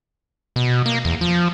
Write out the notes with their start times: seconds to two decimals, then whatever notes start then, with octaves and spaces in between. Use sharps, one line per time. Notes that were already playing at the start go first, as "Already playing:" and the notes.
0.56 B2
0.86 A#3
1.05 E2
1.21 F3